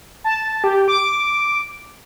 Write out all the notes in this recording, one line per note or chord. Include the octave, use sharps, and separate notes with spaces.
A5
G4
D6